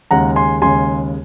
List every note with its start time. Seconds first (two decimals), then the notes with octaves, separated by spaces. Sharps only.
0.11 D#2 C#3 G#3 F#5 A#5
0.36 G#5 C6
0.62 D#2 C#3 G#3 G#5 C6